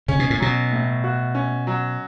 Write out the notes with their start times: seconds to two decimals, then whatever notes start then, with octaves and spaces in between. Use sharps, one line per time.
0.08 C#3 C#4
0.19 B2
0.30 A2
0.40 B2 F#3
0.72 A2
1.04 F#4
1.35 C#4
1.67 F#3